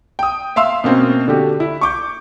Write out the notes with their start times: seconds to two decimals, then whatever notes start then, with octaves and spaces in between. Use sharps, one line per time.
0.19 G5 D#6
0.56 E5 F5 C6 E6
0.84 B2 A#3 C4 C#4
1.28 D3 F#4 G4
1.60 E4
1.81 C#6 D6 G6